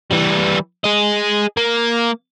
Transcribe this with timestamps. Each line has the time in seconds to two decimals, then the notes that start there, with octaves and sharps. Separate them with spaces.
0.11 E3 G3
0.84 G#4 D#5
1.57 A#3